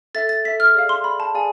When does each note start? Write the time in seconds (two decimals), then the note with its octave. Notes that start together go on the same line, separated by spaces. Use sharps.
0.15 A4 E5 A6
0.29 A6
0.44 A4 E5 B6
0.60 F6
0.75 G#4 D5 F5
0.89 C6
1.04 G#4 D5 F5 B5
1.20 A5
1.34 G#4 D5 F5 G#5